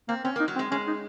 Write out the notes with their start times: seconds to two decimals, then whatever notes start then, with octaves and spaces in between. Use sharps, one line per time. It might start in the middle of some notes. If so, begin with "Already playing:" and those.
0.09 A#3 C4
0.24 C4 C#4
0.36 A#3 D#4
0.48 F#3
0.56 C4
0.59 G#3
0.71 G#3 C#4
0.87 D#4